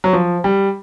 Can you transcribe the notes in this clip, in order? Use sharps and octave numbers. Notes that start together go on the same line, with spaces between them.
F#3
F3
G3